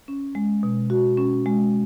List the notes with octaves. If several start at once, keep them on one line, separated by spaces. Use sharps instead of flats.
C#4
G#3
B2
F#4
C#4
G#3